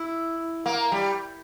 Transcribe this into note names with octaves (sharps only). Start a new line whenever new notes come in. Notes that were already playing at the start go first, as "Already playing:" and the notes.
Already playing: E4
A#3
G3